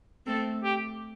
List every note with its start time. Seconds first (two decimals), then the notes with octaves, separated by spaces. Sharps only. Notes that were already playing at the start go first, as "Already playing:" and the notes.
0.26 A3 C4 A4
0.64 G4